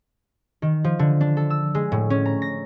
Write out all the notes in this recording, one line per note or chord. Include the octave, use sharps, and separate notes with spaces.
D#3
F3
D3
D4
A4
E6
G#3
A2
C#4
A#5
A#6